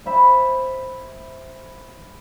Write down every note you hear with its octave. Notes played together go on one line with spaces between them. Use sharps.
E4 C5 E5 B5